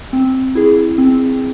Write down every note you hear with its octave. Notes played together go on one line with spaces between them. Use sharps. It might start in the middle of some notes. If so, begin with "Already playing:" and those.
C4
E4 G#4
C4